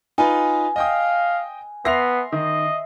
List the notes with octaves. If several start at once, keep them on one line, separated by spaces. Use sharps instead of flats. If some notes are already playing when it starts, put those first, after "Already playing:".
D#4 F4 B4 G#5
D#5 F5 G5 D#6
B3 E5 C6 A#6 C7 F7
D#3 D#5